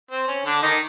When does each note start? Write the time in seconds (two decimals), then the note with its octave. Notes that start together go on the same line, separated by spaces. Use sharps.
0.11 C4
0.28 C#4
0.45 D3 D4
0.63 D#3 D#4